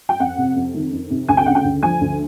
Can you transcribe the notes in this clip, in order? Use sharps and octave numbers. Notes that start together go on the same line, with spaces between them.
G5
F2 F#5
C3
F2
D#3
F2
C3
D2 G#5
G5
C#3 F#5
G5
D2
F3 G#5
D2